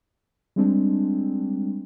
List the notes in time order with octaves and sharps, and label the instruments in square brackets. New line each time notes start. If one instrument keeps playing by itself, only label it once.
[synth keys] G3 G#3 C4 D4